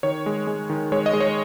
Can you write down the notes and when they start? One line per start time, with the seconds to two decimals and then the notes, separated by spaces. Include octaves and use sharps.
0.03 D#3 C#5
0.26 G#3
0.47 G#3
0.70 D#3
0.92 G#3 C#5
1.06 D#5
1.13 G#3
1.20 C#5